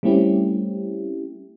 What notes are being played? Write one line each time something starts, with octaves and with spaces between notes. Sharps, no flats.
G3 A3 C4 C#4 E4 G4